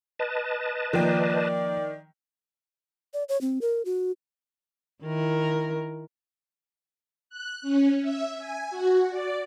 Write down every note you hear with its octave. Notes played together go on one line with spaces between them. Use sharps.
B4 D#5 A5
D#3 F3 A#3 D5 G5
D5
C#5
C4
A#4
F#4
D#3 E4 A#4
F#6
C#4
E5
G#5
F#4
D5